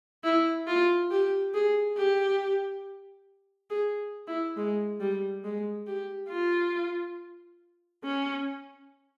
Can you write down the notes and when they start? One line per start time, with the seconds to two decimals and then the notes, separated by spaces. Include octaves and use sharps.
0.24 E4
0.67 F4
1.11 G4
1.54 G#4
1.98 G4
3.71 G#4
4.28 E4
4.57 G#3
5.00 G3
5.44 G#3
5.87 G4
6.30 F4
8.04 C#4